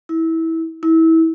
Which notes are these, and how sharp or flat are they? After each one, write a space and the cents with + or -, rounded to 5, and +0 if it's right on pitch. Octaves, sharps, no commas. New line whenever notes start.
E4 -20
E4 -25